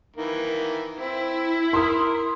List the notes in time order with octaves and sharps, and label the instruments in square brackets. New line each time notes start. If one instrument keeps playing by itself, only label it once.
[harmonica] D#3 E3 A#3
[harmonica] C4 [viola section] E4
[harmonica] A#4 [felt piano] C6 D#6